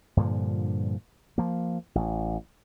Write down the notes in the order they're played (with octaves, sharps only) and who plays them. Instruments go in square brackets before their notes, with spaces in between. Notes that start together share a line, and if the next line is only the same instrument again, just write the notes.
[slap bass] G2 A#2 D3 F3
F3 A#3
A1